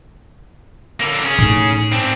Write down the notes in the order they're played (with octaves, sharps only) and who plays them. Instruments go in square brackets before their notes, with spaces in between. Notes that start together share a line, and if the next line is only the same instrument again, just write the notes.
[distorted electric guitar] D3 A#3
C#4 G#4
[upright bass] A2 D#4
[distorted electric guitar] C4 D4